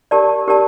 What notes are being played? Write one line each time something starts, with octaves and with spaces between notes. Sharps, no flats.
G4 A#4 D5 A5
G4 A#4 D5 A5